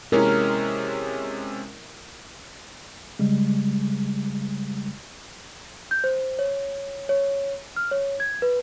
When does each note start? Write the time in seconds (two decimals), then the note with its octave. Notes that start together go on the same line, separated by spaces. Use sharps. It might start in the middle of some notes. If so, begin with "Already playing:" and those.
0.12 C3 G#3 C#4 E4 A#4
3.19 C#3 G3 G#3
5.91 G6
6.04 C5
6.39 C#5
7.09 C#5
7.76 F6
7.91 C#5
8.20 G#6
8.42 B4